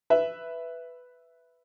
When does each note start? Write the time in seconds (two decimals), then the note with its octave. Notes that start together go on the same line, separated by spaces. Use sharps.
0.10 B4 E5